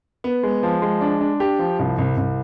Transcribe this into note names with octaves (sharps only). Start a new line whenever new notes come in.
B3
G#3
F3
G#3
D4
D4
G4
F3
C2
C2
C2